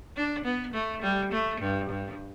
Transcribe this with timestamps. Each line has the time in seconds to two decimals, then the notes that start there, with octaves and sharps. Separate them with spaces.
0.16 D4
0.44 B3
0.74 A3
1.02 G3
1.32 A3
1.60 G2
1.89 G2